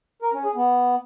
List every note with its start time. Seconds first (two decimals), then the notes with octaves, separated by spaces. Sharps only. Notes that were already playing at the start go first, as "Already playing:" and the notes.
0.22 A#4
0.33 C#4
0.44 G#4
0.55 B3